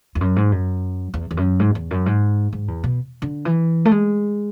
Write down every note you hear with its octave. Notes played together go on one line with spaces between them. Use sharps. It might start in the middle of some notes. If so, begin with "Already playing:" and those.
E2
F#2
G#2
F#2
E2
E2
F#2
G#2
E2
F#2
G#2
G#2
E2
B2
D3
E3
A3
G#3